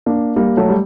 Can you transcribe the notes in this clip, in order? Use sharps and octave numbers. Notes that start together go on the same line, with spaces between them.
A#3 D4
G3 A#3
F#3 A3
G3